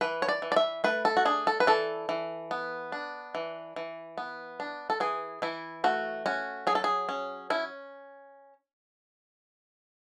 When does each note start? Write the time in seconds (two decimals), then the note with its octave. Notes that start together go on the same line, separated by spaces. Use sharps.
0.01 E3 B4
0.22 C#5
0.29 D5
0.42 E3
0.52 D5
0.56 E5
0.84 A3 B4
1.05 A4
1.17 F#4
1.25 D4 G#4
1.47 A4
1.60 B4
1.67 E3 A4
2.09 E3
2.51 B3
2.92 D4
3.35 E3
3.76 E3
4.18 B3
4.60 D4
4.90 A4
5.00 E3 G#4
5.42 E3 E4
5.84 A3 F#4
6.26 C#4 F#4
6.67 F#3 G#4
6.75 A4
6.84 G#4
7.09 C#4
7.50 C#4 E4